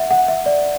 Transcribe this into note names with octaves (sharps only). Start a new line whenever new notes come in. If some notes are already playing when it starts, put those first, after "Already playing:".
Already playing: E5 F#5
F#5
E5
D5